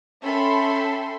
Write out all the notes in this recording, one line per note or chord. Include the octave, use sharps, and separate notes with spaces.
C#4 A4 E5 G5 B5 C6